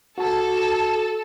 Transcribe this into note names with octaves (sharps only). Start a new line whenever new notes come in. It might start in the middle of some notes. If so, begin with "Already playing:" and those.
F#4 A4 A5